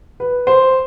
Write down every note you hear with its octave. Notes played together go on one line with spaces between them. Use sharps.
B4
C5